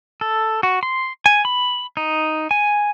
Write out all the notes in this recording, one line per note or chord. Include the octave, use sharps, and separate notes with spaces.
A4
F#4
C6
G#5
B5
D#4
G#5